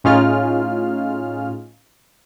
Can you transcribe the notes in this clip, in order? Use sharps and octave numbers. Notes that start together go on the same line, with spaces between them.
A2 C#4 D#4 F4 G#4 F6